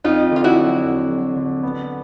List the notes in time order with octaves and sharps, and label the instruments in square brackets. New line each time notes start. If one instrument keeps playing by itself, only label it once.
[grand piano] F2 [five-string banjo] D#4 F4
[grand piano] D3 [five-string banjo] F4
[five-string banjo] E4 F#4
[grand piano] F#3
F2
F#3
D3
B3